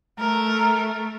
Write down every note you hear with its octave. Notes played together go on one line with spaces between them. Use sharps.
A3 A#4